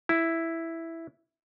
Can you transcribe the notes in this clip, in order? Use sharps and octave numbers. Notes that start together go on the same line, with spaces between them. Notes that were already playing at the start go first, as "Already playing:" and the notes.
E4